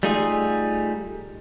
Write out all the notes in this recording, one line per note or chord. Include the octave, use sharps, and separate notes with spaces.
G3 A3 D#4 F4 G#4